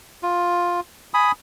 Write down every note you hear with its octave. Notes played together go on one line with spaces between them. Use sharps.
F4
G#5 B5 D#6